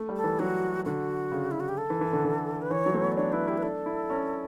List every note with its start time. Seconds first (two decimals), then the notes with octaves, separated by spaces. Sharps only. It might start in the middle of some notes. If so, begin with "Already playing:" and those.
Already playing: A3
0.09 G3
0.16 A4
0.24 E3
0.39 F#3 F#4
0.85 D3 F#4
1.32 C#3
1.51 E4
1.60 F#4
1.69 G4
1.78 A4
1.90 E3
2.01 E3
2.13 D3
2.24 D3
2.62 B4
2.70 E3 C#5
2.86 F#3
2.94 A3
3.01 B3
3.12 D5
3.16 D4 C#5
3.32 E4 B4
3.47 E4 G4
3.58 B4
3.63 D4 A4
3.86 E4
4.10 C#4